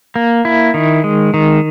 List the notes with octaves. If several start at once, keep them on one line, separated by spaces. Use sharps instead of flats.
A#3
E4
D#3
G#3
D#3